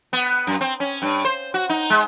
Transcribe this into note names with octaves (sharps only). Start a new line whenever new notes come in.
B3
F#2
C4
C#4
G2
C5
F#4
D#4
G#3